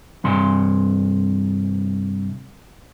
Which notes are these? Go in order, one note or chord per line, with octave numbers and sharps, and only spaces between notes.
G2 C3 C6